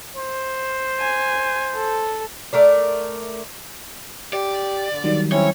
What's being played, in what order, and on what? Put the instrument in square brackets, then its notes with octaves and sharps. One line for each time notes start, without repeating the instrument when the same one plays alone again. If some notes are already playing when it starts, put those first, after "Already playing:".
[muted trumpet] C5
[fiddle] G#5
A4
[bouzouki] A3 A#4 D5
[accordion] G4 [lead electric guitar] D5
[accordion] D3
[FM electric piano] D#3 F#3 G3
[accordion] C4 C#4 E4 [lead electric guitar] C#5